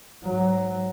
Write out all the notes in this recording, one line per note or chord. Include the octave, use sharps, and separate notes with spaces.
G#2 F#3